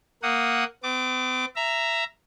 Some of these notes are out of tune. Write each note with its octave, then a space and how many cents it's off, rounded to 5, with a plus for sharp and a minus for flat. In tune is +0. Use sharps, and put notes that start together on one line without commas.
A#3 -5 F#5 +0 D#6 +0
C4 -45 D6 +0
E5 +15 A#5 +0